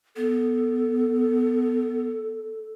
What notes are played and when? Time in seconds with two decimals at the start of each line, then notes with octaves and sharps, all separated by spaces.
0.16 B3 A4